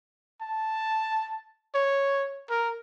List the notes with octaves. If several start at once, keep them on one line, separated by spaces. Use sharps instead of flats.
A5
C#5
A#4